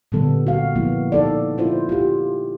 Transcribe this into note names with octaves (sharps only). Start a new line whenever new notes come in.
A#2 D3 G3 B3 A4
F#4 F5
F3 A#3 B3 E4
D#4 A4 D5
E4 F4 C5
F4 G4